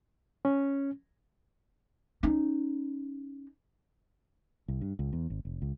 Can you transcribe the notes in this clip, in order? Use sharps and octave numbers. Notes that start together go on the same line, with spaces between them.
C#4
C#4 D#4
C2
G2
C#2
E2
G#1
F1
C#2